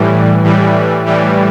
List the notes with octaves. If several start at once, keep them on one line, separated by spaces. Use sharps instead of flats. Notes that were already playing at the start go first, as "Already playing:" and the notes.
Already playing: A2 E3 G3
A2 E3 G3
A2 E3 G3